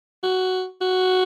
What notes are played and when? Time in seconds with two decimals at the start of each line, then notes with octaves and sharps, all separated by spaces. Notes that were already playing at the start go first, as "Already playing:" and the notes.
0.23 F#4
0.81 F#4